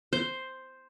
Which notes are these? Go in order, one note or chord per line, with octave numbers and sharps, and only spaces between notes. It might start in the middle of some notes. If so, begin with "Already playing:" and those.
C5